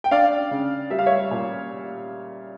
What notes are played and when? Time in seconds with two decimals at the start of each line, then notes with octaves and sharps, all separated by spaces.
0.04 G5
0.11 D4 D5 F5
0.51 C#3
0.90 G3 E5
0.99 F5
1.06 C#5 E5
1.31 A#2